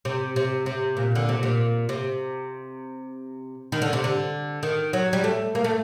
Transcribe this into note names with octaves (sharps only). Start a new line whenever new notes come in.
C3
C3
C3
A#2
D3
C3
A#2
C3
D#3
D3
C3
D3
D#3
F#3
G3
A3
A#3
A3